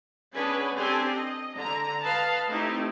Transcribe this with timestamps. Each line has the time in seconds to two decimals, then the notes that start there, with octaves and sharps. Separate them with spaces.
0.34 B3 C#4 D4 G#4 B4 G#5
0.75 C4 D4 G4 A4 G#5
1.14 D#5
1.57 D3 A#5
2.04 B4 D#5 F5 A5
2.49 A3 C4 D#4 E4 G4